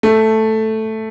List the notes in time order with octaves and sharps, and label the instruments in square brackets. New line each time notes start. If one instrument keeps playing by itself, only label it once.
[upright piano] A3